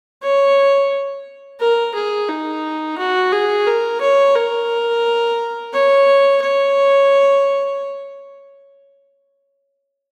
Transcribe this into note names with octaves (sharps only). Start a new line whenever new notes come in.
C#5
A#4
G#4
D#4
F#4
G#4
A#4
C#5
A#4
C#5
C#5